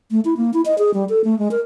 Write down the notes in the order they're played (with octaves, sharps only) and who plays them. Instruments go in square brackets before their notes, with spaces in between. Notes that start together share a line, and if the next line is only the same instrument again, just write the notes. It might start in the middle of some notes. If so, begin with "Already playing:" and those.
[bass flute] A3
E4
A#3
E4
D#5
G#4
G3
A4
A3
G#3
A#4